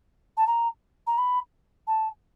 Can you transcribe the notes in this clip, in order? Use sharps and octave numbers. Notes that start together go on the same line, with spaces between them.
A5
A#5
A#5
B5
A5